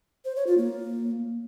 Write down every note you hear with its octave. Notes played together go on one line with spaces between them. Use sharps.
C5
C#5
F4
A#3